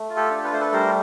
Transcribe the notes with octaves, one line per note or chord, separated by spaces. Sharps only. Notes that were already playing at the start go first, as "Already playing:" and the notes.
Already playing: A3
F4
G4 A4
D4
B4
A3 C5
A4 B4
G3 A#4 C5